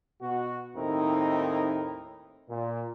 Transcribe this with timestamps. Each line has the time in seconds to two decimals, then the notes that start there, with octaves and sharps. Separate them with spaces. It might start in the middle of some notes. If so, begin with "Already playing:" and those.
0.21 B2 F#4
0.76 D#2 A2 C4 D#4 E4 A#4
2.49 A#2